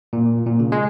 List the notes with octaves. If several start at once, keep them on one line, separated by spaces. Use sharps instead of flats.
A#2
A#2
C#3
G#3